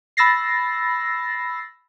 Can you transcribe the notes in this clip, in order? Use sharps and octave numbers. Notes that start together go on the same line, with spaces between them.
B5 E6 A6 A#6 C7